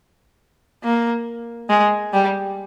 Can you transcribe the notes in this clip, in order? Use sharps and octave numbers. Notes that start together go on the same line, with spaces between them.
A#3
G#3
G3